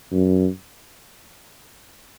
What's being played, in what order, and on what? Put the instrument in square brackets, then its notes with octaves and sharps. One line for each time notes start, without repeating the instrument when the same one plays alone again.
[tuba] F#2